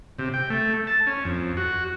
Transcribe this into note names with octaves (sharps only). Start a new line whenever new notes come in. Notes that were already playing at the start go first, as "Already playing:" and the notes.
C3
G5
A3
A5
C#4
F2
F#4